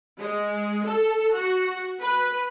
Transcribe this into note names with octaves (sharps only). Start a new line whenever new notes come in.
G#3
A4
F#4
B4